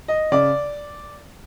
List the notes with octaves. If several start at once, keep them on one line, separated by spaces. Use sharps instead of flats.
D#5
C#3 D5